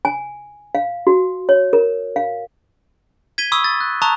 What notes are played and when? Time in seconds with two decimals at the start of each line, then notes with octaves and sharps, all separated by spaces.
0.05 G#5
0.75 F5
1.07 F#4
1.49 C#5
1.73 A#4
2.16 F5
3.38 G#6 B6 D#7 G7
3.52 B5 C#6 D#6 E6
3.64 A6
3.81 F#6
4.02 A5 A#5 C#6 D#6 F#6 F7